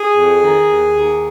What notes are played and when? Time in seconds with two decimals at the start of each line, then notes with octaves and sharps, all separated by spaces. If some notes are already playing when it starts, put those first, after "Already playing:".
Already playing: G#4
0.16 F2
0.43 D#3
0.70 D#2
0.97 D#2